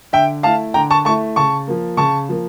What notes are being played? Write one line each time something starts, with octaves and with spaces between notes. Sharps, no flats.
D3 E5 G5
A3 E4 F5 A5
D3 G5 A#5
A5 C#6
A3 E4 A5 C#6
C#3 A5 C#6
F3 A#3
C#3 A5 C#6
F3 A#3